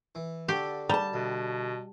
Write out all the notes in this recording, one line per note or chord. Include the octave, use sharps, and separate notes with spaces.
E3
D3 F#4 G4 A4
G3 A5 A#5
D2 B2